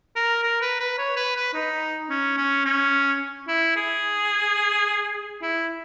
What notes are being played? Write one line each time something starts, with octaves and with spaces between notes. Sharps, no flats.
A#4
A#4
B4
B4
C#5
B4
B4
D#4
C#4
C#4
C#4
E4
G#4
E4